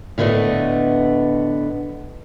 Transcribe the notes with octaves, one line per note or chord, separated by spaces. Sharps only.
A2 D3 A3 B3 D#5